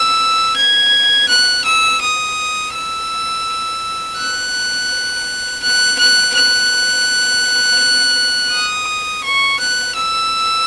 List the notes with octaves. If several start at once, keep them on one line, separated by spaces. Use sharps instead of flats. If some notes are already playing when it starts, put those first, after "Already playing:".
Already playing: E6
G#6
F#6
E6
D#6
E6
F#6
F#6
F#6
F#6
D#6
C#6
F#6
E6